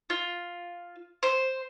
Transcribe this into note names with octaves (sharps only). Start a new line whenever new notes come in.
F4
C5